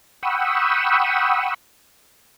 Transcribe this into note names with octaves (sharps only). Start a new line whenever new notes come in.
F#5 G5 B5 C#6 D#6 E6